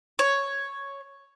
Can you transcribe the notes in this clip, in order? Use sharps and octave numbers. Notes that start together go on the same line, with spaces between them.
C#5